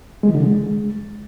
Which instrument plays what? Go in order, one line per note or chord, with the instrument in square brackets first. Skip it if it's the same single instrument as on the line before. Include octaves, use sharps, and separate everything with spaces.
[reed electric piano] G#3
E3
D3
C#3
G#3